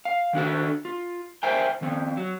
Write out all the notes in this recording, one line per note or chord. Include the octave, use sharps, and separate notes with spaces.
F5
D#3 D4 F#4 A4
F4
A#4 C5 E5 G5 G#5
D#3 F3 C4
F#3